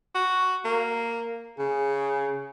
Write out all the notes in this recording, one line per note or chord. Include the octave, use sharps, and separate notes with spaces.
F#4
A#3
C#3 G#4